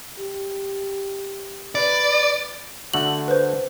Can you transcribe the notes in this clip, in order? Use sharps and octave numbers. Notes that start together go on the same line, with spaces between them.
G4
B4 D5
D3 A3 F#4 F#7
B4 C5